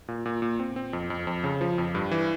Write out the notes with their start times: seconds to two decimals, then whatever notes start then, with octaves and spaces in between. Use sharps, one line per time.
0.08 A#2
0.26 A#2
0.42 A#2
0.60 C4
0.76 C4
0.93 F2
1.10 F2
1.27 F2
1.44 C#3
1.61 F3
1.78 F2
1.95 G2
2.11 E3